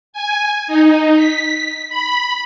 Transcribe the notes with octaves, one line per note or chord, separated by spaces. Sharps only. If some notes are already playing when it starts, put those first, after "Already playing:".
G#5
D#4
B6
B5